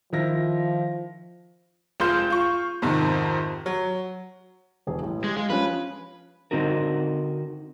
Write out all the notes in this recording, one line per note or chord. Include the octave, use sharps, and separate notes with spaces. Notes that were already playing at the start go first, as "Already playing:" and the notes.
D#3 F3 E4 A#6
F1 G#3 F4 C6 G6 E7
F4 C#6
F2 G#2 C3 D#3
F#3
E1 G#4
A1
G#3 G4
G#3 F5
F3 C#4 B4
D3 C4 D#4 F#4 A#4